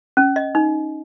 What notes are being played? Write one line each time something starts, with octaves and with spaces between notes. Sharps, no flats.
C#4
D#5
D#4